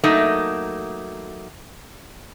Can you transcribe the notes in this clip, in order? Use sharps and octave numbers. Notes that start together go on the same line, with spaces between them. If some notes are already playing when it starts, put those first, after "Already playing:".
F#3 A3 A#3 D#4